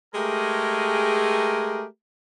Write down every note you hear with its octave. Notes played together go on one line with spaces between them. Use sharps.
G#3 A3 G4 G#4 A#4